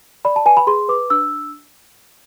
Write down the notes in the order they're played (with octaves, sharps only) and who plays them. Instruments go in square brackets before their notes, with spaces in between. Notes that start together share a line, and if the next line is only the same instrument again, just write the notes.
[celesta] D5 B5
A5
B4 G#5
B5
G#4 C6
B4 D6
D4 E6